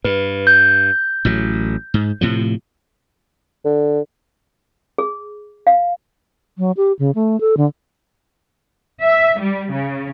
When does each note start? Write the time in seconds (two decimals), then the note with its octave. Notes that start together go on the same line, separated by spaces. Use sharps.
0.05 G2 B4
0.47 G6
1.25 A1 A2 F#3
1.94 G#2
2.21 A2 C3 F3
3.65 D3
4.98 G#4
5.67 F5
6.58 F#3
6.77 G4
6.99 C#3
7.15 A3
7.41 A4
7.57 D3
9.02 E5
9.39 G3
9.71 C#3